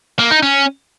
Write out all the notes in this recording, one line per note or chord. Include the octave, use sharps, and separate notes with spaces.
A#3
D#4
C#4